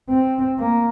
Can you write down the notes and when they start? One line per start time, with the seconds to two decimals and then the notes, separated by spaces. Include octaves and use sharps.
0.09 C4
0.59 A#3